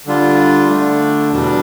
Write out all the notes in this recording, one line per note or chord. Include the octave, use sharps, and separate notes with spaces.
D3 G3 D4 F4
D3 A3 D4
E2 B2 G3 D4